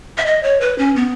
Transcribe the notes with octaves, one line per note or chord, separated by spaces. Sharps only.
E5
D#5
C#5
B4
C#4
B3